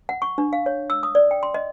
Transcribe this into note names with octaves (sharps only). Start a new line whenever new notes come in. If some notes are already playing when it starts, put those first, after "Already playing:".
F#5
C#6
D4
F5
C#5
E6
D#6
D5
G5
C6
D#5